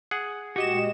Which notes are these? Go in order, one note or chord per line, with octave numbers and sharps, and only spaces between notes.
G#4 F#5
A#2 G#3 F#4 G4 D#5 E7